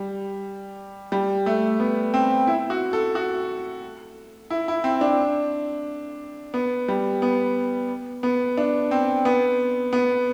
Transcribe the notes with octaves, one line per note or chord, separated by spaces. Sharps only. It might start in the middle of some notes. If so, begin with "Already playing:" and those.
Already playing: G3
G3
A3
B3
C4
E4
F#4
A4
F#4
E4
E4
C4
D4
B3
G3
B3
B3
D4
C4
B3
B3